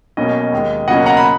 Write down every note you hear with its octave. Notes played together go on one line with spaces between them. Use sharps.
B1 B2 A#3 C#4 D#5
D#2 D#3 G#3
C#2 B2 F#3 A#3 C#4 D#5 F#5
F#5 A#5
B5